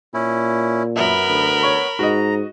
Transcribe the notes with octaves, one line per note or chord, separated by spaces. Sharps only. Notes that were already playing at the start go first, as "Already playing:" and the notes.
A#2 C#4 E4
F#2 B3 A#4 E5 B5
D2
C#5 C#6
G#2 F#4 D#5 A#5